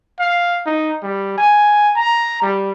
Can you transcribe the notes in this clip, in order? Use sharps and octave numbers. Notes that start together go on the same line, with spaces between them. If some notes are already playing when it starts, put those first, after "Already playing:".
F5
D#4
G3
G#5
A#5
G3